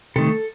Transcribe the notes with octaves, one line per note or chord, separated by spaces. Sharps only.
C3 D#3 A3 A4